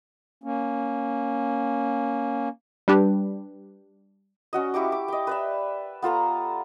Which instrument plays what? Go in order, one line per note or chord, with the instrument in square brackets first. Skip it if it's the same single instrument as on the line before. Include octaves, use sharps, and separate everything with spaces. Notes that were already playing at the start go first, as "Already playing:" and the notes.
[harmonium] A#3 C#4
[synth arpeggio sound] G3 D4 G4 B4
[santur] C#4 F#4 D#5
E4 G4 C#6 D6
D6
D#5 G5
B4 D5 E5
B3 F4 A4 A#5